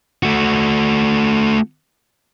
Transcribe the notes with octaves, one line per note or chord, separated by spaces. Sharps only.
A3 F#4